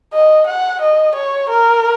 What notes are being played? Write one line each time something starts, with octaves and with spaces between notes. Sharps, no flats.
D#5
F#5
D#5
C#5
A#4